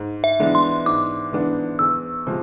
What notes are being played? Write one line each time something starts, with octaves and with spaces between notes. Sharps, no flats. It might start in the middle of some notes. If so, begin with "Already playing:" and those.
Already playing: G#2
E5
E3 G#3 B3 D4
C6
G#2 D6
E3 G#3 B3 D4
E2 E6
C3 F3 G#3